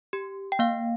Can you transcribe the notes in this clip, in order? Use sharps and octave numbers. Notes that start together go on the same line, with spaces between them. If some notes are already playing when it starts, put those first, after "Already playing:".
G4
G5
A#3 F5